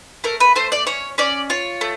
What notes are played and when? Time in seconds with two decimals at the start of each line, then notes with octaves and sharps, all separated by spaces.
0.24 A3 A#4
0.40 B4
0.55 A3 C5
0.72 D5
0.87 C#4 C#5
1.18 C#4 D5
1.50 F4 C#5
1.81 A3